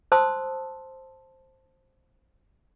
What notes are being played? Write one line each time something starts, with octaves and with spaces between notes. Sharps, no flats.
C5 A5 C6 D#6 E6